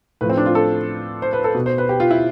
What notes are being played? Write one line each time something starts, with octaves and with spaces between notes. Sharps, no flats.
A2 F3 B4
C4
D4
F4
A4
C5
B4
A4
B2
C5
B4
G4
F4
E4